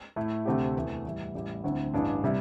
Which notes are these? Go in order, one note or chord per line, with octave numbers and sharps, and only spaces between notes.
A2 A3 E4
D2 C3 A3 C4 G4
E2 E3 A3
A2 E3 G3 E4
A1 A2 G3 E4 G4
D2 D3 C4 E4
A1 G2 G3 D4
C3 G3 E4